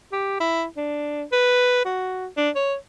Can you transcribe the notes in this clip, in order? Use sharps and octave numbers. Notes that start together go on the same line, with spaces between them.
G4
E4
D4
B4
F#4
D4
C#5